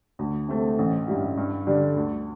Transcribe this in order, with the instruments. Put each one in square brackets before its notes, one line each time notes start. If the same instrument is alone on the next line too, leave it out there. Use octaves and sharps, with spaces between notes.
[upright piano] D2
C3 A3
A1
G2 G3 E4
G2
D3 G3 D4
D2